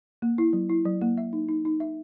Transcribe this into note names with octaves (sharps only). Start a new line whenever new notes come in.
A#3
E4
F#3
E4
F#3
A#3
E5
D#4
D#4
D#4
E5